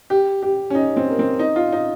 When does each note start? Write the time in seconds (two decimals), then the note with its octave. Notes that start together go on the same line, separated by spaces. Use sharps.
0.10 G4
0.42 G4
0.70 C#4
0.75 D#4
0.97 C4
1.10 A#3
1.19 C4
1.39 D#4
1.56 F4
1.72 D#4